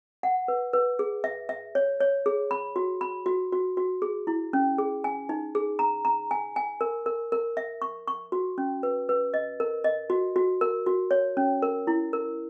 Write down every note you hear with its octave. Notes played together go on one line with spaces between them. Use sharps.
F#5
B4
B4
G#4
E5
E5
C#5
C#5
G#4
B5
F#4
B5
F#4
F#4
F#4
G#4
E4
C#4
G#4
G#5
D#4
G#4
A#5
A#5
G#5
G#5
A#4
A#4
A#4
E5
C#6
C#6
F#4
C#4
B4
B4
D#5
A#4
D#5
F#4
F#4
A#4
F#4
C#5
C#4
A#4
E4
A#4